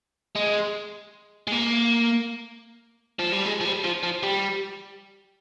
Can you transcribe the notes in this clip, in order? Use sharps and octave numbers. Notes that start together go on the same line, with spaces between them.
G#3
G#3
A#3
F3
G3
G#3
F3
G3
F3
F3
G3